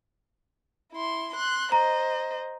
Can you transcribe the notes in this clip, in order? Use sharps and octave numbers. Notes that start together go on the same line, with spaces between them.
E4 C6
C6 F#6
C5 D#5 A#5